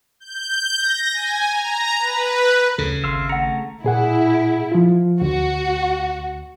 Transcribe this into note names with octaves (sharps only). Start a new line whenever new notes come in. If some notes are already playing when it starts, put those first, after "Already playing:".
G6
A#6
G#5
A#5
B4
D2 C#3 A4
G#1 E5 F5 C6
A3 F#5 A#5 C#7
A#2 E4 G#4 F#5
F3 F4
D2 F#4